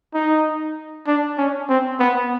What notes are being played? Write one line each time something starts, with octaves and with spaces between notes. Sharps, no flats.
D#4
D4
C#4
C4
B3